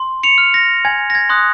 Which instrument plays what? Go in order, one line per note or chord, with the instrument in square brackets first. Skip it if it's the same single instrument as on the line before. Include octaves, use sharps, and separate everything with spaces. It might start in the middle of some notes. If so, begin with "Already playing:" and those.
Already playing: [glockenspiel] C6
C#7 F7
F6
A#6
G#5 G#6
A#6
G#6
C6 D#6 F#6